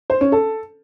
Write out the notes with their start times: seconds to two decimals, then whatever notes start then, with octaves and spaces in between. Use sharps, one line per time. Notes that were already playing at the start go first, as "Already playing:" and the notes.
0.10 C5
0.21 C#4
0.32 A4